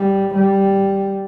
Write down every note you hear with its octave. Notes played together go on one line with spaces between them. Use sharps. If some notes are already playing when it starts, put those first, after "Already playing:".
Already playing: G3
G3